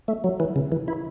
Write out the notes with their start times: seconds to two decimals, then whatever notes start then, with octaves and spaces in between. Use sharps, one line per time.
0.08 A3
0.24 F#3
0.40 E3
0.56 C#3
0.72 E3
0.88 E4